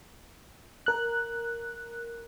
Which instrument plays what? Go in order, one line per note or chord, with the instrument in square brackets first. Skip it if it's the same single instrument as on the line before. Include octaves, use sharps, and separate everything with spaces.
[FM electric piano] A#4 F#6